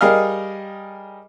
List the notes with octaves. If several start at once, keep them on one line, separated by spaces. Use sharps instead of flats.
G3 G#4 A#4 D#5 F5 F6